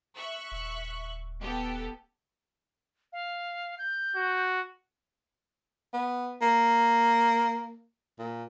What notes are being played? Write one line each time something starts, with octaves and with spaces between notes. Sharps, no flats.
E5 C#6 F#6
D#1
B3 G4 A4
F5
G6
F#4
B3
A#3
A#2